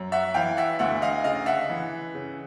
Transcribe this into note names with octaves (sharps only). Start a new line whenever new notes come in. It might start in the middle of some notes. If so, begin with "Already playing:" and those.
Already playing: F#2
E5 F#5
E3 F5 G5
E5 F#5
D2 E5 F#5
D#5 F5
C#3 D#5 F5
E5 F#5
E3
C#3